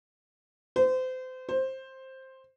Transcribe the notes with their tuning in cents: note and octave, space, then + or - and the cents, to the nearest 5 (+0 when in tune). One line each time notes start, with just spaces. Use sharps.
C5 -30
C5 +10